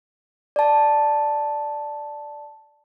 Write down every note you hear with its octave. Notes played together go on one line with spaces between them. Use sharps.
D5 A5